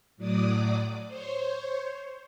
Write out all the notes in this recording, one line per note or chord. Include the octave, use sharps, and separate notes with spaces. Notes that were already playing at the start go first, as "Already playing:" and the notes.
A2 F#3 D5 D6 D#6
C5 C#5